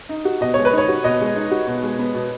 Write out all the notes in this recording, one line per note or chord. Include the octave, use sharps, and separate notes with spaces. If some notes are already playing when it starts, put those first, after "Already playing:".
D#4
F#4
B2 D#5
G#3 C#5
B4
D#4 C#5
F#4
B2 D#5
G#3
D#4
F#4
B2
G#3
B3
B2